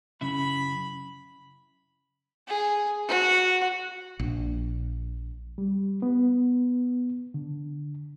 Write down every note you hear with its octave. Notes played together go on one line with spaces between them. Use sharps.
F#2 C#3 E4 B5
G#4
F#4
A#1
G3
B3
D3